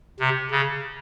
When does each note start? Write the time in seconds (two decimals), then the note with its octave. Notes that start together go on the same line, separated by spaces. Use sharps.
0.20 C3
0.51 C#3